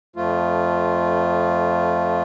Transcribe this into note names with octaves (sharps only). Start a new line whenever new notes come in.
F2 F3 A3 F4